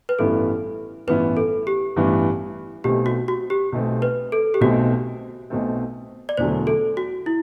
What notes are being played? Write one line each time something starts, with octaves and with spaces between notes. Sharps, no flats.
B4
A1 G2 E3 B3 E4 A4
A1 G2 E3 B3 E4 B4
A4
G4
A1 G2 E3 B3 E4
B1 B2 A3 C4 G4
F#4
F#4
G4
B1 B2 A3 C4
B4
A4
G4
B1 B2 A3 C4 F#4
B1 B2 A3 C4
D5
E1 E2 D3 F#3 A3 C5
A4
F#4
E4